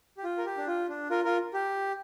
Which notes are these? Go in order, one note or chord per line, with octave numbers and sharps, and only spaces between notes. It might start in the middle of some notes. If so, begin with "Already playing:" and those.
G4
F4
A#4
G4
D4
F4
D4
F4 A#4
F4 A#4
G4